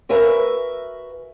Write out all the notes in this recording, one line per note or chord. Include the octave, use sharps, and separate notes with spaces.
F#4 A#4 B4 E5 G#5